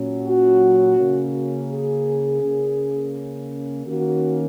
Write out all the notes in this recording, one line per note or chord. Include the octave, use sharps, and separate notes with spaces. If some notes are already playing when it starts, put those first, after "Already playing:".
Already playing: A#2 F#3 C#4
F#4
C#3 A#3 C#4
G#4
C#3 A#3 C#4
D#3 A#3 C#4 F#4